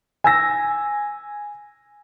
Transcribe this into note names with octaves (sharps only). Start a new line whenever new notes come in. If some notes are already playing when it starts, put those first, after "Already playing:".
G#5 E6 A#6